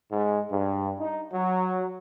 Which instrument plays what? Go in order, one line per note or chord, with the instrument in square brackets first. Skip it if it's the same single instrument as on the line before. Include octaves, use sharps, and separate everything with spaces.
[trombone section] G#2
G2
D#4
F#3